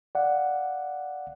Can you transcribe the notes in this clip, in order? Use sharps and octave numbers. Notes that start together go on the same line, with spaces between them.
D5 F5 F#5